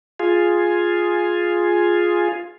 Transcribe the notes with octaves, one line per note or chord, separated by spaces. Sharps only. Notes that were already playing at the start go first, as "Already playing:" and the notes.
F4 G#4